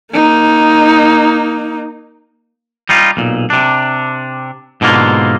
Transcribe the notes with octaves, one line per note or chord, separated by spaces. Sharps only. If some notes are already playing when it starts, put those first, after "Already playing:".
A#3 D#4
G3 D#4 F4
B1 A#2
C3 D4
G#2 B2 D3 A#3 F4